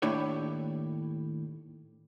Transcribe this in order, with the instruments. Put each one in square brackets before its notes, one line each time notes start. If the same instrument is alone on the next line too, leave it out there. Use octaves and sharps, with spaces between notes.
[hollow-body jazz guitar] D#2 A2 D4 E4 G4 C#5